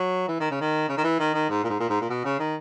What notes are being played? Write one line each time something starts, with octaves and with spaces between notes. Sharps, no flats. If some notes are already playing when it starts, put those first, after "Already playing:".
Already playing: F#3
E3
D#3
C#3
D#3
C#3
D#3
E3
D#3
D#3
G#2
A#2
G#2
A#2
G#2
A#2
B2
C#3
D#3